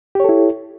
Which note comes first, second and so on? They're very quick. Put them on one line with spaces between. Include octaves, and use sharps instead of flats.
G4 C#5 A4 E4